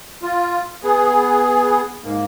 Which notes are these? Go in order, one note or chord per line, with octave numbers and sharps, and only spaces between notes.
F4
B3 G#4
G#2 A#3